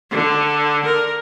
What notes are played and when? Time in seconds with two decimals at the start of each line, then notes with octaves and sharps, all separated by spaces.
0.10 D3
0.85 A#4